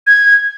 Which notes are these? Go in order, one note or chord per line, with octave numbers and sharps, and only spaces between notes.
G#6